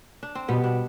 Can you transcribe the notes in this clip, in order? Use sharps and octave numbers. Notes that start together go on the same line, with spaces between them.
D4
C4
B2 G3 B3
D4